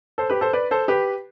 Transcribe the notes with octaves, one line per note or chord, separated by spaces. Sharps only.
A4 C5
G4 B4
A4 C5
B4 D5
A4 C5
G4 B4